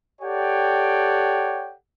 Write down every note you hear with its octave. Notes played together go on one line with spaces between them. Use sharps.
G4 A4 C#5 D5 F#5 G5